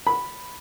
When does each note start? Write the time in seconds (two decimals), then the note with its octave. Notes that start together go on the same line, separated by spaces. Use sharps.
0.07 B5